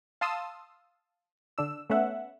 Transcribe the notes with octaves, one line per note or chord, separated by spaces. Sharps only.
F5 A5 C6 D#6 E6
D3 D4 E6
A3 B3 C#4 E5 F#5